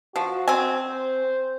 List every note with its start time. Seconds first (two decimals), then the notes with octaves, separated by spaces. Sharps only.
0.16 F3 F#4
0.48 C4 G#5
0.81 C5